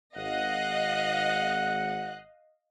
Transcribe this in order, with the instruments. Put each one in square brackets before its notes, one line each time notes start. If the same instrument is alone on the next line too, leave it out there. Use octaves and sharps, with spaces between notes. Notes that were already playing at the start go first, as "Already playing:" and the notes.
[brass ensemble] G#1 F#5 [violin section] D#5 F5 F#6